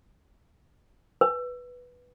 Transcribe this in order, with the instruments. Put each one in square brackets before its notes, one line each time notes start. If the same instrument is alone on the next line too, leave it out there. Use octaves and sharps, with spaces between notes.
[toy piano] B4